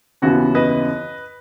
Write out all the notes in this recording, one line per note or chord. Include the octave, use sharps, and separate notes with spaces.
D#2 C#3 E3 B3 F#4
B4 D#5